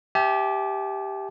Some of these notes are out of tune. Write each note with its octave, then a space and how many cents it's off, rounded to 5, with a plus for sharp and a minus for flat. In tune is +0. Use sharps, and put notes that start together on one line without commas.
G4 +0 E5 +0 A5 -45